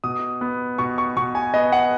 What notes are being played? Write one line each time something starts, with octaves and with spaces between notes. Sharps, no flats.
B2 D#6
B3
B2 C#6
C#6
B2 C#6
G#5
B3 D#5
F#5